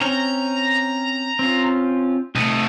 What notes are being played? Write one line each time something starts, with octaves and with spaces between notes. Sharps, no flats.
C4 C#4 A#5
C4 C#4 F4
C2 A3 D#5